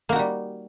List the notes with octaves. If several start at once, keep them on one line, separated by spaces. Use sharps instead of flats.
G3 A#3 D#4 F#4